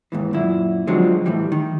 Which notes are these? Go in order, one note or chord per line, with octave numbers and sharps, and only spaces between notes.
D#2 G#2 E3
F#2 A#2 E4
D3 F3 F#3 G#3 C4
A2 E3 G3
D#3